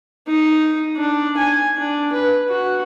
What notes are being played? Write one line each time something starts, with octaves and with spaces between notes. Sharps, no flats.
D#4
D4
G#5
D4
B4
F#4